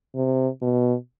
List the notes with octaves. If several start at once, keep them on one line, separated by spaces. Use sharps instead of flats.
C3
B2